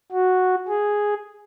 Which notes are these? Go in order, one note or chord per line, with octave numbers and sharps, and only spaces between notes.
F#4
G#4